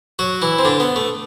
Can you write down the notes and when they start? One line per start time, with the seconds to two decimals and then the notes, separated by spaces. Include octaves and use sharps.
0.19 F#3 F#4
0.42 E3 E4
0.59 C4
0.65 D3 D4
0.80 B3
0.96 A3